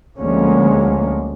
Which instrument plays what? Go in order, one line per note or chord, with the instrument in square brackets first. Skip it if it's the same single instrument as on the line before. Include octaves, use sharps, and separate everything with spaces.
[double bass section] D2 D3 F3 G#3 A#3 C#4